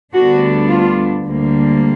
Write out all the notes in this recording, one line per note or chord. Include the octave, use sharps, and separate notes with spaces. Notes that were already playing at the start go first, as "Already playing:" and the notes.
D2 D3 G3 B3 D4 F#4
F4
D2 D3 G3 A#3